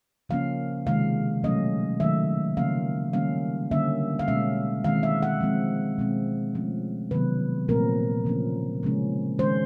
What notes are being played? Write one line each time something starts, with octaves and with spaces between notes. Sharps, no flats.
C#3 F3 A#3 C#4 F5
C3 D#3 G#3 F5
B2 F#3 A3 C#4 D#5
D#3 F#3 A3 E5
C#3 F3 A#3 C#4 F5
D#3 G3 A#3 C#4 F5
D3 G3 A#3 C#4 E5
F5
B2 G#3 C#4 E5
D#3 G#3 C4 F5
E5
F#5
F3 G#3 C4
B2 G#3 C4
F3 A3 C#4
C3 D#3 F#3 B3 B4
A#2 F3 A3 C4 A#4
C#3 F3 A#3 C#4
C#3 F3 G#3 C#4
D#3 G#3 C#4 C5